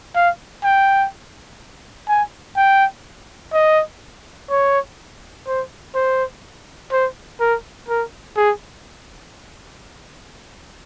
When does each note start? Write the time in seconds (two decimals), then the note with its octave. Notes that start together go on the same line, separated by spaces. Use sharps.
0.15 F5
0.64 G5
2.08 G#5
2.56 G5
3.53 D#5
4.50 C#5
5.47 C5
5.95 C5
6.92 C5
7.40 A#4
7.89 A#4
8.37 G#4